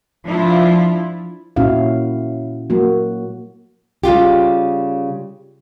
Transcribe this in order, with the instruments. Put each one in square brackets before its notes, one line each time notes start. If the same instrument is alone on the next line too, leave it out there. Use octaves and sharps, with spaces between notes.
[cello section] F3 D4 E4 F4
[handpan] A#2 C#4 E4 F#4 F5
F#3 A#3 F#4
[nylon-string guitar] C#3 G3 F4 G4